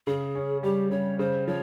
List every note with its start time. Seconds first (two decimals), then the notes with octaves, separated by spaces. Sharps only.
0.07 C#3 G#4
0.35 C#4
0.63 G3 G4
0.91 C#3 C#5
1.19 C#3 C5
1.47 F3 C#5